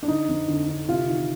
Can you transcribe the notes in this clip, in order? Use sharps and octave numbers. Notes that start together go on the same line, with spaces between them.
D4
D3 D#4
F2
D3
D3
C3 F4
D#3